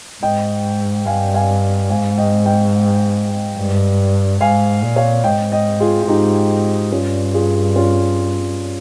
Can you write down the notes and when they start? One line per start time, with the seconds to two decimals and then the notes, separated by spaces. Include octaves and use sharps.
0.22 G#2 D#5 G5
1.06 G2 F5 G#5
1.34 F5 G#5
1.89 G#2 F5 G#5
2.18 D#5 G5
2.45 D#5 G5
3.57 G2
4.41 G#2 F5 G#5
4.83 A#2
4.96 C#5 F5
5.24 G#2 D#5 G5
5.52 D#5 G5
5.80 F4 G#4
6.02 F4
6.08 G#2 D#4 G4
6.91 G2 C#4 F4
7.33 F4 G#4
7.76 C#4 F4